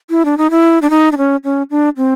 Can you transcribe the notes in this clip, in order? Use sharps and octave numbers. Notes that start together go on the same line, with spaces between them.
E4
D4
D#4
E4
D4
D#4
D4
C#4
C#4
D4
C4